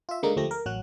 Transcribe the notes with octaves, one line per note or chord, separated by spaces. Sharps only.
F4 E5
D3 G#3 A#3 D#4
D2 F3 A3 G4 A#6
A#4
A1 F#3 F#4 F#6